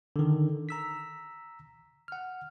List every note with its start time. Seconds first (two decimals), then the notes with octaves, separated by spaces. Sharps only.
0.16 D3 D#3
0.69 A#5 E6 B6
2.08 F#5 F6